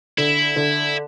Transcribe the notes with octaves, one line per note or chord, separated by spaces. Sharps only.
D3 E4
D3